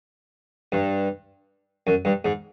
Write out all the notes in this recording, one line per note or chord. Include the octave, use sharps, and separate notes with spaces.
G2
F#2
G2
G#2